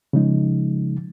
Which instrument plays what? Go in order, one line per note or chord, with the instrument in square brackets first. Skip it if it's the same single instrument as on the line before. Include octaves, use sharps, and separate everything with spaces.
[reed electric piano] C#3 F3 G#3 D#4